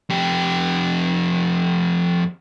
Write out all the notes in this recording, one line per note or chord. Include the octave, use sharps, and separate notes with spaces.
F2 G4